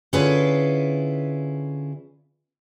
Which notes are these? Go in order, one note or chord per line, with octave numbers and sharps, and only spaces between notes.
D3 C#4 E4 F4 G#4 B4